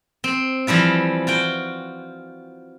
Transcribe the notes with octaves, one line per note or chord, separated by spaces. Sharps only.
C4
E3 F3 G3 F4
F4 F#4 G5